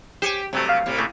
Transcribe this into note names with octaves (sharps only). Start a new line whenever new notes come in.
G4 C5 C#5 G#5
G2 C3 F#3 A3
F5
A2 C3
C#3 A3 A#3